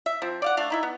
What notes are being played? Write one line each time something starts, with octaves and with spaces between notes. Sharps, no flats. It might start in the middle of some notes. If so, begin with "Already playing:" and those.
E5
F3 C4
D5 F5 F#5
A3 D4 D5 F5
D#4 E4 E5
B3